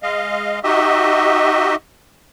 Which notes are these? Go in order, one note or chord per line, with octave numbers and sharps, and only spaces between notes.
G#3 D#5 F5
D#4 F#4 G4 D#5 E5